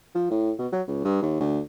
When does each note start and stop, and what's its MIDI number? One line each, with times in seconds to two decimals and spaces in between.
0.15 0.28 53
0.31 0.51 45
0.59 0.67 47
0.72 0.82 54
0.88 1.04 37
1.05 1.20 43
1.22 1.37 39
1.40 1.60 38